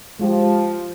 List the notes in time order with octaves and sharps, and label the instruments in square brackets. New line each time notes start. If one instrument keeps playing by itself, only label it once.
[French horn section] F3 [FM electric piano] G#3 F4 G4